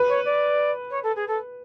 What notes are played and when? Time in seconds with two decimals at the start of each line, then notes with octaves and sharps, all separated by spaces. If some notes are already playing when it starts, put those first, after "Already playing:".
Already playing: B4
0.08 C#5
0.25 D5
0.90 C#5
1.03 A4
1.16 G#4
1.28 A4